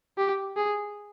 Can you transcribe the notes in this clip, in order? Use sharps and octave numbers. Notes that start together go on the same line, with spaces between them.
G4
G#4